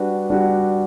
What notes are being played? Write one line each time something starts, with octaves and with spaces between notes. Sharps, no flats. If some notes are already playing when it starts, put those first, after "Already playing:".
Already playing: G3 D4 F#4 B4
G3 D4 F#4